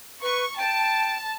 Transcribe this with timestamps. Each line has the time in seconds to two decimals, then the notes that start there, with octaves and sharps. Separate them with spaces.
0.22 B4 C#6
0.57 G5 A5